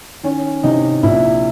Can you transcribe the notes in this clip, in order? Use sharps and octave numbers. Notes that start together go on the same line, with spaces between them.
D#3 C#4
C3 D#4
A#1 E4